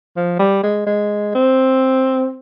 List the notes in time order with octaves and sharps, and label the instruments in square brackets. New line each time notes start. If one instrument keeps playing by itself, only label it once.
[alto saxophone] F3
G3
G#3
G#3
C4